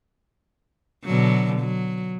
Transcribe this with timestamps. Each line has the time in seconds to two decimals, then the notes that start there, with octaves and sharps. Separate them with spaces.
1.05 B2 D3 F#3
1.60 F#3